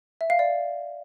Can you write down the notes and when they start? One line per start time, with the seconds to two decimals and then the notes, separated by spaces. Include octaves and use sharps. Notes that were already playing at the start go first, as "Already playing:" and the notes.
0.21 E5
0.30 F5
0.39 D5